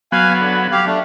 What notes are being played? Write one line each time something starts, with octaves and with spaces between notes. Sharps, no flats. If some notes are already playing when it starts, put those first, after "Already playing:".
F#3 B3 F5 G#5
D3
G4 F5
A3 D4